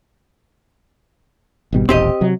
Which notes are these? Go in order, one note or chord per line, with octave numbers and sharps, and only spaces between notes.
G#1 B2 G3
D#1 A1 C4 G4 D#5
C3 F#3